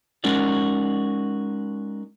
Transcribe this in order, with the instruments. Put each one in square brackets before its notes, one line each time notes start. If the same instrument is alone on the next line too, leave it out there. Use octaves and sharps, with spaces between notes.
[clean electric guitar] G#3 C#4 D#4 F#4 A#4 D5